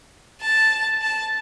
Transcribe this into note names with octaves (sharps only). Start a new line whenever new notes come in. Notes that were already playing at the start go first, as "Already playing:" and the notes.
A5
A5